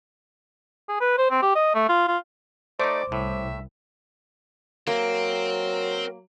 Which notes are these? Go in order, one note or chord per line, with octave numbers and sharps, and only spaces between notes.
G#4
B4
C5
C4
G4
D#5
A3
F4
F4
A3 D#4 C5 D5 D6
C2 A2 E5
F#3 A#3 C4 A#4